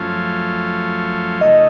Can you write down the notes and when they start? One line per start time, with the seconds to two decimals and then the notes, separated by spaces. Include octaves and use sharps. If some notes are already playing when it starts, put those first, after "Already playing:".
Already playing: F#2 F3 A3 C#4 F4
1.41 C#3 A3 D#4 D#5